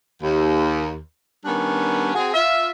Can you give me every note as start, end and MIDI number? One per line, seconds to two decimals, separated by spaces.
0.22 0.96 39
1.45 2.10 51
1.45 2.10 55
1.45 2.10 59
1.45 2.10 61
1.45 2.10 62
2.15 2.33 60
2.15 2.33 66
2.15 2.33 68
2.34 2.70 65
2.34 2.70 76